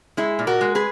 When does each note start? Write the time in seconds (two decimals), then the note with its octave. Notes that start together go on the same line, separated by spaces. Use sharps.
0.17 G#3 E4 G#4
0.39 A#2
0.47 F#4 A#4
0.61 G#3
0.75 G#4 B4